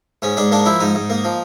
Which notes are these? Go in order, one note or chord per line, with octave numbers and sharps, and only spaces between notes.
G#2 C#4
G#2 D4
A#3 D4
F3 E4
G#2 D#4
G#2
A#3
F3